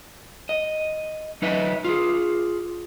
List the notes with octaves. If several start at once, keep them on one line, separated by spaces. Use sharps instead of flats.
D#5
F#3 D#4 B4 D#5 E5
F4 G#4